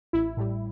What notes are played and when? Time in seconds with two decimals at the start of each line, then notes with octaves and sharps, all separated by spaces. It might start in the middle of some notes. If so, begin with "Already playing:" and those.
0.13 A1 E4
0.37 A2 G3